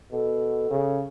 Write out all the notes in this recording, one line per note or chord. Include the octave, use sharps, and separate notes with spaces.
B2 A4
C#3